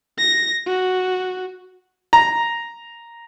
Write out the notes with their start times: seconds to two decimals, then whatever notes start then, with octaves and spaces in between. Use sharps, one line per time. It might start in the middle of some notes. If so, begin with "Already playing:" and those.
0.19 A#6
0.66 F#4
2.13 A#5